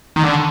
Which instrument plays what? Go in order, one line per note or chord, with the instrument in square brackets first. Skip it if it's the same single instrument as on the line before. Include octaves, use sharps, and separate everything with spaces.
[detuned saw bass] D#3
D3